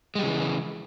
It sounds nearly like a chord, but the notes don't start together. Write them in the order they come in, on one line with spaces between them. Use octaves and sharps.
G#3 G3 C#3 E3